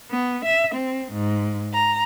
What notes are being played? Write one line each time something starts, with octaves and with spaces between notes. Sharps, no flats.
B3
E5
C4
G#2
A#5